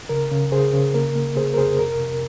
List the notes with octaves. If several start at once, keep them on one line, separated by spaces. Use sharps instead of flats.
C#3 A#4
C#3
C#3 G#4 C5
C#3
A#3 A#4
A#3
C3 G#4 C5
A#4
F2 G#4 C5
C3 A#4
C3